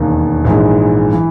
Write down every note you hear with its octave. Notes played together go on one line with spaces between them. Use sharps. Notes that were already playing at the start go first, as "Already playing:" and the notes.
Already playing: E1 D#2 D#3
A#1 G#2 E3 G#3
E3